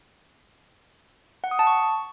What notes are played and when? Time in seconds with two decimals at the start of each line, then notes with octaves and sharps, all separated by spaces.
1.44 F#5
1.51 D#6
1.59 A5
1.67 C#6